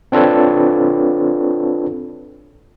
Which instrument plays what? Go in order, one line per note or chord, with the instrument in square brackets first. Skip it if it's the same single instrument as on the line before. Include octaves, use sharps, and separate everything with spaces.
[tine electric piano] C4 D4 F4 A4 B4 C#5